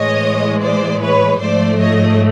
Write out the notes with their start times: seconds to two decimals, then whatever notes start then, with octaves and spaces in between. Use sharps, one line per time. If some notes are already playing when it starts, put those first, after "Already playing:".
Already playing: A2 E3 G#3 C#5 D#5
0.61 C5 D5
1.01 B4 C#5
1.40 G#2 F3 A3 C5 D5
1.80 C#5 D#5